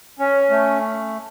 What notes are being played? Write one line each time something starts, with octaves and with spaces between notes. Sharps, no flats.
C#4
A3